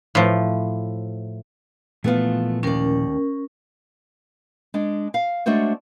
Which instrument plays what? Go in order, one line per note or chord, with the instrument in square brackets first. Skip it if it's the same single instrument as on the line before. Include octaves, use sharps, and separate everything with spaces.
[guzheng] A2 F3
[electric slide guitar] A#2 E3 F3 [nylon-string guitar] A3 B3 F4
[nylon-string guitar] D#2 D5 [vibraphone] C#4 A#4
[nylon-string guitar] G#3 D4
F5
G#3 A3 D4 F#4 C5 C#5